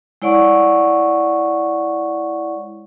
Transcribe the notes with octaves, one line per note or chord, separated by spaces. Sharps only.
G#3 E4 C#5 D5 F#5 C#6